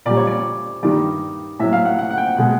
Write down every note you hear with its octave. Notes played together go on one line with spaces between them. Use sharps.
A#2 G3 D5
C#5
D5
G2 D#3 G3 D5
A2 F#3 E5
F5
F#5
F#5
F#5
G5
B2 G#3 F#5